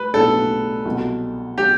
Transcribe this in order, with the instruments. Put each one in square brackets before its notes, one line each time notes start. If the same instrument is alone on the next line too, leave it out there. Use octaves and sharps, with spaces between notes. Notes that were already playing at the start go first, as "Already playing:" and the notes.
Already playing: [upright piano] A2 G3 [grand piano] B4
[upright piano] B1 A2 G3 B3 D4 [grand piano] A4
[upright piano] C2 B2 F#3
[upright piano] B2 F#3 [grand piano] G4